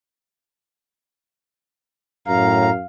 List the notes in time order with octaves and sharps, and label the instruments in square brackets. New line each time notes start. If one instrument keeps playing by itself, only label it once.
[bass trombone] F#2 [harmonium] A2 A#5 [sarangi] F5